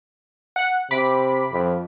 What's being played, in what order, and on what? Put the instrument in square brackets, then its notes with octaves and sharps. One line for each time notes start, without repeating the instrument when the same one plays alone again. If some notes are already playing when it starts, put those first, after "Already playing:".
[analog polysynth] F#5
[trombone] C3 [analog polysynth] B5 D6 B6
[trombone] F2